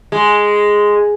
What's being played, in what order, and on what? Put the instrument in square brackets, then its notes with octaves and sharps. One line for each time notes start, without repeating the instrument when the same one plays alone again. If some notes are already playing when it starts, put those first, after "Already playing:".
[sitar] G#3